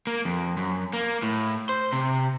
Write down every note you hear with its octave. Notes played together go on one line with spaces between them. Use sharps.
A#3
F2
F#2
A#3
A2
C5
C3